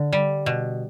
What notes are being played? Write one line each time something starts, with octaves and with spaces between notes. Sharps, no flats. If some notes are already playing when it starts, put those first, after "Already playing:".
Already playing: D3
G3
B2